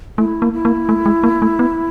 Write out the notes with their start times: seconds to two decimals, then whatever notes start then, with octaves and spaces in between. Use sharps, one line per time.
0.18 A3 E4
0.42 A#3
0.53 E4
0.65 A#3
0.89 A3
1.06 G#3
1.24 A#3
1.42 A3
1.59 B3